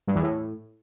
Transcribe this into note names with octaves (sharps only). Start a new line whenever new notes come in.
G2
E2
A2